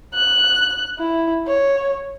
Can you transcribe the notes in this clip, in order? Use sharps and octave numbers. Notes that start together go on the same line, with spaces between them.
F#6
E4
C#5